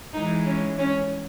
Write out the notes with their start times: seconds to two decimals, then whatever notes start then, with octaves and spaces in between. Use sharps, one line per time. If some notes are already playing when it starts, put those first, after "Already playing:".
0.14 E3 G#3 D#4
0.46 C#4
0.78 C#4